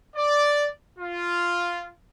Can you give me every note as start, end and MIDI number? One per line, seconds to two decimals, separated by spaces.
0.15 0.66 74
0.98 1.88 65